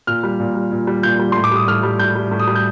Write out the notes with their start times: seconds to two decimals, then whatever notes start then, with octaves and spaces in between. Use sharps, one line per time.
0.07 A#2 F6
0.23 G3
0.40 A#2
0.55 G3
0.72 A#2
0.87 G3
1.03 A#2 G6
1.19 G3
1.32 A2 C6
1.44 D6
1.51 G3 D#6
1.68 A2 F6
1.83 G3
1.99 A2 G6
2.16 G3
2.31 A2
2.40 D#6
2.47 G3
2.56 G6